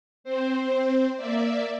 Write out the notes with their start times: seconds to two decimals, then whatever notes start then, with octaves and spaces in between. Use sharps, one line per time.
0.24 C4 C5
1.17 A#3 D5 E5